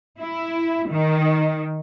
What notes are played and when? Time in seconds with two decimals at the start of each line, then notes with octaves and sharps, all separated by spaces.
0.20 E4
0.89 D#3